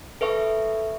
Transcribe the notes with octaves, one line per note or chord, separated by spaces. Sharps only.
A4 B4 E5 C#6